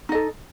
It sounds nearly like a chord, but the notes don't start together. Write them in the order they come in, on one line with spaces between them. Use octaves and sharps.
D#4 D#5 A4